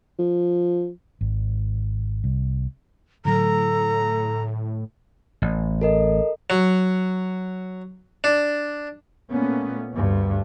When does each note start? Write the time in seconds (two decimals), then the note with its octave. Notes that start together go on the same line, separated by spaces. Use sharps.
0.19 F3
1.21 G#1
2.24 C2
3.25 A2 D3 F#3 A4 A#5
5.42 A1
5.81 A4 A#4 D#5
6.50 F#3
8.24 D4
9.30 A#2 A3 B3 C#4
9.94 D2 G2